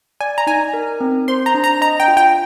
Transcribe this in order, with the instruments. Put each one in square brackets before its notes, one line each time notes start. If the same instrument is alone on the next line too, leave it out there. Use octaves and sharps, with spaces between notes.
[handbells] D5 [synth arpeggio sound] G#5
[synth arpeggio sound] A#5
[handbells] D#4 [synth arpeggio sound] G#5
[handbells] A#4
C4
[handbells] C5 [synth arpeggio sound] C6
[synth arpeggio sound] A#5
[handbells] D4
[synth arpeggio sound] A#5
[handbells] D#5 [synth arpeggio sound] A#5
[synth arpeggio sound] G5
[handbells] F4
[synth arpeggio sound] G5